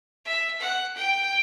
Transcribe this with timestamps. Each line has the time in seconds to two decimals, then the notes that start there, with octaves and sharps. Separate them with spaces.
0.25 E5
0.61 F#5
0.96 G5